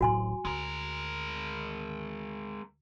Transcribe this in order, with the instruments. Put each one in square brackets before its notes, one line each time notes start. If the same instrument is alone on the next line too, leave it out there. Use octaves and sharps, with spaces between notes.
[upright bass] D1 A1 [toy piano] F#4 G#5 C6
[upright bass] D2 [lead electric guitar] G#3 A#4